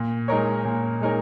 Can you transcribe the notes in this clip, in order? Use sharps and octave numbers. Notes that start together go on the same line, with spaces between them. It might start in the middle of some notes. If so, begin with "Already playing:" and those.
Already playing: A#2
G#3 D#4 A#4 C#5
A#2
G#3 D#4 A#4 C#5